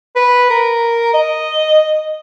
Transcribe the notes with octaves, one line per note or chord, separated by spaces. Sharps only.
B4
A#4
D#5